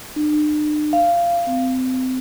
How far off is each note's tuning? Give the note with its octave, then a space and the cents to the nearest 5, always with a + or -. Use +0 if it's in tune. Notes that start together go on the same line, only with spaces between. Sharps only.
D4 +45
F5 -15
C4 -25